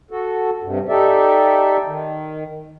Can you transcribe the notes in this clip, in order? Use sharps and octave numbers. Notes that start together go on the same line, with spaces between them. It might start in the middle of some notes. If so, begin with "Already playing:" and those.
F#4 A4
G2 C3
D#4 G4 A4 D5 E5
D#3